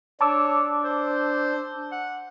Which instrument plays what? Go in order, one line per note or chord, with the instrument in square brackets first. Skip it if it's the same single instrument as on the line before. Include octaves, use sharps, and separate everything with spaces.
[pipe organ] D4 [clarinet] C#5 [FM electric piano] A5 D6 E6
[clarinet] C5
F#5